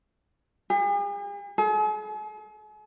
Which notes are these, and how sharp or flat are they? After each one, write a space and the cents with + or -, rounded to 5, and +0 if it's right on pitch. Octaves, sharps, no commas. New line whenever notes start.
G#4 -45
G#4 +45